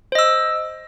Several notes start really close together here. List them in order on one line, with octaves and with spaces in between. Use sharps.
C5 D#5 E6